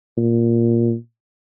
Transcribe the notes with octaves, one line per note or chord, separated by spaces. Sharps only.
A#2